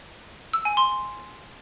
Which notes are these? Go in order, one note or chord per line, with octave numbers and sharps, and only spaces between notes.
E6
G#5
C6